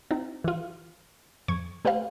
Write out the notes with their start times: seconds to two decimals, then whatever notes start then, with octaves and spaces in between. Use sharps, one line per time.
0.11 C4 D#4
0.44 E3 F4
1.48 F2 C#6 G#6
1.85 A3 G4 B4 C5 F5